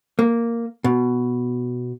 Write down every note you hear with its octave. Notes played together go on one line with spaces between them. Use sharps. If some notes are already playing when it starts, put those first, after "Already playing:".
A#3
B2